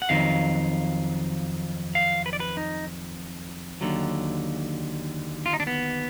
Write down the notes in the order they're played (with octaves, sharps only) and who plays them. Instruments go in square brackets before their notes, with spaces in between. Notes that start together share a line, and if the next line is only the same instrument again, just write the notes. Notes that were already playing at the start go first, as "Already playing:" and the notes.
[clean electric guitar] F#5
F2 D#3 F#3 F5
F5
B4
D5
B4
D#4
D#2 D3 F#3
F4
D#4
D4
B3